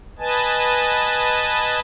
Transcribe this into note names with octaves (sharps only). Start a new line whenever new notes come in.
B4 D#5 G#5 A5